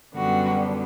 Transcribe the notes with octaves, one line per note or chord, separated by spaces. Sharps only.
F#2 D3 G3 B3 F#4